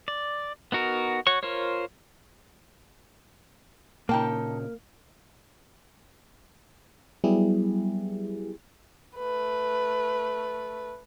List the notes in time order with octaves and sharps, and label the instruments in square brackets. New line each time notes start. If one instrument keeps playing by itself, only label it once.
[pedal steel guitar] D5
B3 D#4 F#4 A#4
F#4 C#5 C#6
F4 A#4 C5 C#5
[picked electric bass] A#2 C#3 [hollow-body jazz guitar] A#3 [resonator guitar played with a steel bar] D#4 G5 A5
[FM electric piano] F#3 G3 B3 E4 G4 G#4
[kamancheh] A3 B4